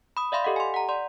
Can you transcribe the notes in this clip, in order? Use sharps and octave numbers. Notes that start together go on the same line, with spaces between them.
B5 D#6
D5 E5 F5 B5 C6
G4 A4 D#5 F#5
G#5 C6
F#5 A#5
D5 C6